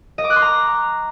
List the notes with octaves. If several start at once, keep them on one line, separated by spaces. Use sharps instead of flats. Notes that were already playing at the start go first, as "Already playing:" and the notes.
D#5
D6
F#6
C6
A#5